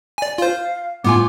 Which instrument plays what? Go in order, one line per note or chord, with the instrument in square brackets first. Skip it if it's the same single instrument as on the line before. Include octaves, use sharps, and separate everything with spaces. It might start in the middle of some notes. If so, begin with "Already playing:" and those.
[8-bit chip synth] D5 G#5
[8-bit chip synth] F4 C5 [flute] F5
[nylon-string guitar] A2 F4 G#5 [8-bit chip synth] B3 [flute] D6